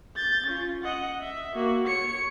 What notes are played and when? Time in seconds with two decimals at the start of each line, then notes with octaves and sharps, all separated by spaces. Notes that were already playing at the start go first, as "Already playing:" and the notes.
0.16 G6 A6
0.46 C#4 F4
0.83 D#5 F#5
1.21 E5
1.55 A#3 F#4
1.87 C#5 C#7